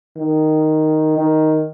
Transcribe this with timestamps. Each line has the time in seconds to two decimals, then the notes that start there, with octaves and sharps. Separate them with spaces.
0.17 D#3
1.17 D#3